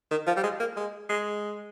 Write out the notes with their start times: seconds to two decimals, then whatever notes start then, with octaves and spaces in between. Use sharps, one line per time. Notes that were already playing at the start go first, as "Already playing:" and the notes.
0.11 D#3
0.27 F3
0.37 G3
0.43 G#3
0.60 A#3
0.77 G#3
1.09 G#3